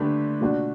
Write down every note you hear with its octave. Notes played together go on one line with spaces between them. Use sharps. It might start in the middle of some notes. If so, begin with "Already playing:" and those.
Already playing: D3 A3 D4 G4 B4
B2 A3 D4 F#4